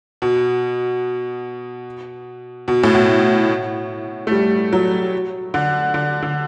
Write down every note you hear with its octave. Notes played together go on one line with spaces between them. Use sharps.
B2
B2
A2
B2
A3
G3
F#3
D3
D3
D3